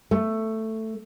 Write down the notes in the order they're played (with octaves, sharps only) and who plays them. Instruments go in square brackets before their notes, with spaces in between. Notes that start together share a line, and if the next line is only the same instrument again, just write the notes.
[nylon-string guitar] A3